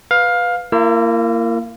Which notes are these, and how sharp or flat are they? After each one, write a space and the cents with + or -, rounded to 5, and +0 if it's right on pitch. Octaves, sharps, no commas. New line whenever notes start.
B4 +0 F5 +15
A#3 -15 E4 +40 E6 +35